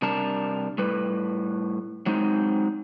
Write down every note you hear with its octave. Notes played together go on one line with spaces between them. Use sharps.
C3 G3 D4 A#4 A5
A2 G3 B4
F#3 G#3 C4 D#4